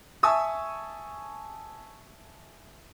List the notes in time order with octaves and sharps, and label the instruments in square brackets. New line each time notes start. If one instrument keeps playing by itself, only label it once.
[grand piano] E5 G#5 A5 C#6 D#6 E6